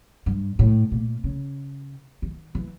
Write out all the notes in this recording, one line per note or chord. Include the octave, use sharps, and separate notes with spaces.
G2
A2
A#2
C#3
D#3
E3